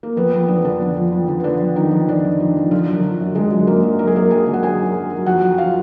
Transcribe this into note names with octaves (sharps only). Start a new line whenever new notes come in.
A#3
F2 B3
F2
F2 D4
B3
F2 D3 D4
F2
F3
F2
D3
B3
D3 D4
F2
F2 D#3 D#4
F2
D3 D4
F3
F3
F3
D3 F3 F4
F#2
F#3 F#4
D3
F#2
D3 G#3 G#4
F#2
F#2 A#3 A#4
F#3
F#2 A#4
G#4
F#2 A#3 A#4
F#2 G#4 G#5
D3
F#5
F#3 G#4 G#5
F#2
F#3
F#3
F2 F#4 F#5
F2
F4 F5